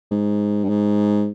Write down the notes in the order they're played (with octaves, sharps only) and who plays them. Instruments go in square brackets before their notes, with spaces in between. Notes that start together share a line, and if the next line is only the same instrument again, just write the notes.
[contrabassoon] G#2
G2
G#2